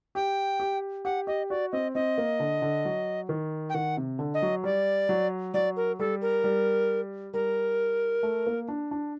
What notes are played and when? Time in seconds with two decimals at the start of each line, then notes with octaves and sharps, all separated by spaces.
0.15 G4 G5
0.60 G4
1.05 G4 F#5
1.27 G4 D#5
1.50 F#4 D5
1.72 C4 D#5
1.95 C4 D#5
2.18 A#3
2.40 D3
2.62 D3
2.85 F#3
3.29 D#3
3.70 G5
3.74 D#3 F#5
3.97 C3
4.19 D3
4.34 D#5
4.42 F#3
4.64 G3 D5
5.09 F#3
5.54 F#3 D5
5.77 A#4
5.99 G3 A4
6.22 A#4
6.44 G3
7.34 G3 A#4
8.23 A3
8.47 A#3
8.68 D4
8.91 D4